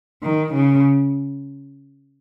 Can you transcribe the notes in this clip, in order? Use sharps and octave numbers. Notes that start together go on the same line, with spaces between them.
D#3
C#3